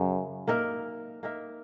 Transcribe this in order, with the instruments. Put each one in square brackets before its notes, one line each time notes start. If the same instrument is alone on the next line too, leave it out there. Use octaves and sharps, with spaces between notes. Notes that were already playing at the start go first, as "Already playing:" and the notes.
Already playing: [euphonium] F#2 [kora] C#3 F#3
[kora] A#3 D#4 A#4 E5
A#3 D#4 A#4 E5